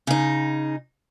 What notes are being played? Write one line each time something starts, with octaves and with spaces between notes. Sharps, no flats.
C#3 D#4